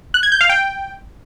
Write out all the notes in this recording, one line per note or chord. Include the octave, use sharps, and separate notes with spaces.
F#6
G#6
G6
F5
G5